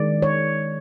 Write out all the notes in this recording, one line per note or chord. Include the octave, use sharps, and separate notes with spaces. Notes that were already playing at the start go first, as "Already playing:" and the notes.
Already playing: D#3 G#3 D5
C#5